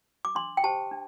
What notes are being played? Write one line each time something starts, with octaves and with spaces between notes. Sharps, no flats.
D6
D4 C6
G5
G4 C5 A5
D4